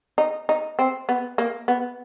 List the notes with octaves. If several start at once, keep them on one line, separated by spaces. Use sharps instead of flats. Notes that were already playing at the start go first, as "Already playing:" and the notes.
D#4
D#4
C4
B3
A#3
B3